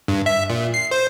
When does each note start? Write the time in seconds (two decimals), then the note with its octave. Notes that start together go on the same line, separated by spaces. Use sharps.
0.08 G2
0.26 E5
0.50 A#2
0.74 C7
0.91 C5